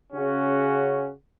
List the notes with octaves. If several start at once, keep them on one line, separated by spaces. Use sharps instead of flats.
C#3 C#4 F#4